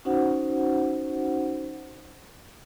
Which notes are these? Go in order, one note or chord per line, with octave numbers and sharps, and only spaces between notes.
C#4 D#4 F#4 C5 F#5